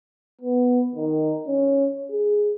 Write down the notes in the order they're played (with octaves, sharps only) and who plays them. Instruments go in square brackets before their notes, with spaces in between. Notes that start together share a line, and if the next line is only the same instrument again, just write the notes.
[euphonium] B3
D#3
C#4
G#4